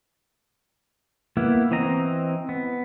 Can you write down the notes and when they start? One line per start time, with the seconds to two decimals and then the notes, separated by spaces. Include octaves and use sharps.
1.37 A#3 B3 E4
1.71 E3 C4 D#5 A#5
2.49 B3